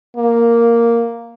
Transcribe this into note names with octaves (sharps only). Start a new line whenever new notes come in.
A#3